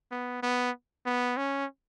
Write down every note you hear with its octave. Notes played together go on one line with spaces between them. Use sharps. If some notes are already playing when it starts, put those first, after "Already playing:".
B3
B3
B3
C#4